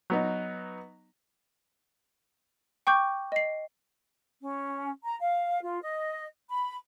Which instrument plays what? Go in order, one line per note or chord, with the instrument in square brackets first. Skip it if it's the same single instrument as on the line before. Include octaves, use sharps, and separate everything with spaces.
[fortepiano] F#3 B3 D#4
[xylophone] G5 C#6 D6 G6
D#5 C7
[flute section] C#4
A#5
F5
F4
D#5
B5